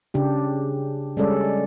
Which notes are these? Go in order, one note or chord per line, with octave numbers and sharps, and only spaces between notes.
C#3 D4 G4
G3 G#3 C#4 A4 D5